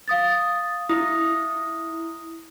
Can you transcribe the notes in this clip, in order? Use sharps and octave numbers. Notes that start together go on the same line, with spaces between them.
F5 D#6 A6
E4 D#6